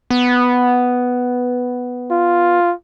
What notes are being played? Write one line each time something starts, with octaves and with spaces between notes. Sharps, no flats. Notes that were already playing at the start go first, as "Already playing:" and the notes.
B3
F4